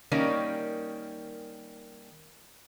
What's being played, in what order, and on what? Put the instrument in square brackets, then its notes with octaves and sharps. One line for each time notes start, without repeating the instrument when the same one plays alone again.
[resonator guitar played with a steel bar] D#3 G3 A#3 C#4